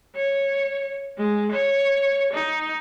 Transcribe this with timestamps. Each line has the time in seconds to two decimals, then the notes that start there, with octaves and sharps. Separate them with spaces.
0.15 C#5
1.17 G#3
1.51 C#5
2.32 D#4